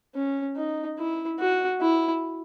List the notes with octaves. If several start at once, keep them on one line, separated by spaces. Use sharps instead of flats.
C#4
D#4
E4
F#4
E4